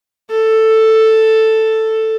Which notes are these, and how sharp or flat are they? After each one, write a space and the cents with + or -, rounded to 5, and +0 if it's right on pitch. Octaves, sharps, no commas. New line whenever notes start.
A4 +5